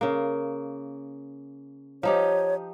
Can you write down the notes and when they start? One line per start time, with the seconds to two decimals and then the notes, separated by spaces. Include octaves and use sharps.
0.01 C#3 A#3
2.03 F3 D#4 G4 C#5